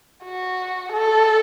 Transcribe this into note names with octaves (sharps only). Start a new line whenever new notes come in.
F#4
A4